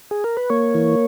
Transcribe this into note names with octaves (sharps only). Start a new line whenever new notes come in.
G#4
A#4
B4
A#3 C#5
E3